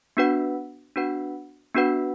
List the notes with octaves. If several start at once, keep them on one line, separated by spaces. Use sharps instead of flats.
B3 D4 F#4 B4 F#5
B3 D4 F#4 B4 F#5
B3 D4 F#4 B4 F#5